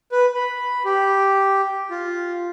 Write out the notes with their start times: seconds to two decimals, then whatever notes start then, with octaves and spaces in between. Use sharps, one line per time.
0.12 B4
0.35 B5
0.85 G4
1.91 F4